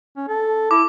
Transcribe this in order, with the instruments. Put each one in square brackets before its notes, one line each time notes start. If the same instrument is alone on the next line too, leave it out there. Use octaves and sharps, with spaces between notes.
[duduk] C#4
A4
[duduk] E4 [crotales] D6